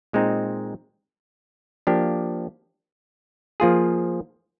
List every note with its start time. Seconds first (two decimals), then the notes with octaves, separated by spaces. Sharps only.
0.13 A#2 G#3 C4 D#4
1.87 F3 A#3 D4 G4
3.60 F3 A#3 F4 G#4